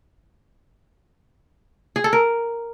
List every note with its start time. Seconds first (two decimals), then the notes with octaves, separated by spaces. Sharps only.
1.96 G#4
2.04 A4
2.13 A#4